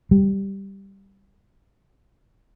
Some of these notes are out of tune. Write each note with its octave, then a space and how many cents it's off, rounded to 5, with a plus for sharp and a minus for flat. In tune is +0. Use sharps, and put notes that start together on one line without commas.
G3 +0